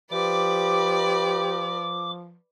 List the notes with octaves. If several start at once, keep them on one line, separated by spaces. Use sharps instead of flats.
F3 G4 B4 D5 D6